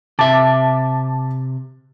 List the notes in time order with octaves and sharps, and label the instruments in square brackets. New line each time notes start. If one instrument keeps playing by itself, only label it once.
[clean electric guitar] C3 E5 [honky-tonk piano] A5 D6 A6